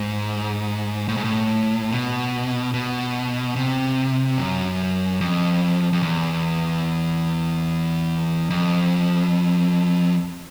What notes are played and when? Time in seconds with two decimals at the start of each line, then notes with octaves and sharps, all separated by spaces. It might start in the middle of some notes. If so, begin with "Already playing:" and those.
Already playing: G#2
1.08 A2
1.17 G#2
1.24 A2
1.91 B2
2.74 B2
3.56 C3
4.38 F#2
5.21 F2
5.93 F2
6.02 E2
8.50 F2